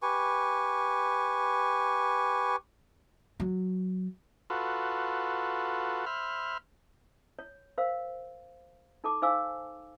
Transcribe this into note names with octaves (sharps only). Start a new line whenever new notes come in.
G4 B4 G#5 C#6
F#3
F4 F#4 A4 B4
C5 E5 B5 F6
C#5
A#4 C5 F5
D#4 A4 A5 D6
D#4 C5 F5 G#5 D6 E6